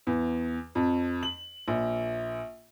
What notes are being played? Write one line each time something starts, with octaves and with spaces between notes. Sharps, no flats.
E2
F2
F#7
A#1